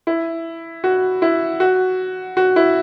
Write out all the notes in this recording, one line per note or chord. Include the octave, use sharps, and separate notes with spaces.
E4
F#4
E4
F#4
F#4
E4